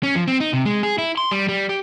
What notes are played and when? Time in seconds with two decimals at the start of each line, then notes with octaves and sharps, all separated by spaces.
0.03 C#4
0.16 F3
0.28 C4
0.40 D#4
0.53 C3
0.65 G#3
0.83 G#4
0.98 E4
1.17 C6
1.31 G3
1.49 G3
1.69 G4